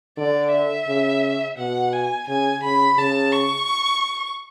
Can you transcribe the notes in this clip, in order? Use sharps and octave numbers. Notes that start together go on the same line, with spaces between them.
D3 D5
E5
C#3
B2 F#5
G#5
C#3 G#5
C#3 B5
C#3 A5
C#6